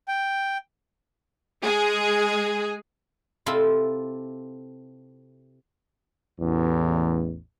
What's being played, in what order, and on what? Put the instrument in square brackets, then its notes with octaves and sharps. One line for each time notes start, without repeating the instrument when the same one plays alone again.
[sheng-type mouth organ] G5
[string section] G#3 G#4
[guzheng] C3 C4 E4 F4 A4
[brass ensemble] A1 E2